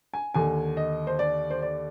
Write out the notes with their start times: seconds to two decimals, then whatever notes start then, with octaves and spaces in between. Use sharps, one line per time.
0.14 G#5
0.34 D#2 D3 G#5
0.77 D#5
1.07 C5
1.19 D5
1.50 C5
1.62 D5